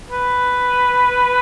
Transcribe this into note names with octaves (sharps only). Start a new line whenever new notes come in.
B4